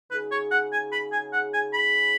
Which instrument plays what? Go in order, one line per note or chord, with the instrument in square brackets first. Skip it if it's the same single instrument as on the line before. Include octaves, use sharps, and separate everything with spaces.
[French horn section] C#3 F#3 D#4 G#4 [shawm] B4
[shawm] C#5
F#5
G#5
B5
G#5
F#5
G#5
B5